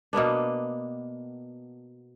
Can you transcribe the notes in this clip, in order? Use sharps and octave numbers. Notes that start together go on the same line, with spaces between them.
B2 A#3 B3 D4